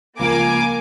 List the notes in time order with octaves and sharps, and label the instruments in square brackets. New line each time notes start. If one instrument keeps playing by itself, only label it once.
[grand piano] C#2 F3 [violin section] A#3 G#5 D6